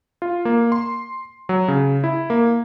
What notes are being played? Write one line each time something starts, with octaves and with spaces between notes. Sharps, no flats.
F4
A#3
C6
F#3
C#3
E4
A#3